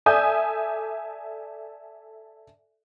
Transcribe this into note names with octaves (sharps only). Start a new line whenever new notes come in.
A4 D5 E5 G#5 D#6 G6